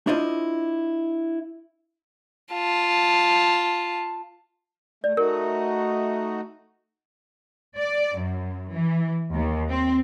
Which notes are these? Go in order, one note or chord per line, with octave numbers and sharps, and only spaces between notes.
D4 E4 F4 C5 D#5
F4 A5
A3 D5
A3 D#4 F#4 A#4
D5
F#2
E3
D#2
C4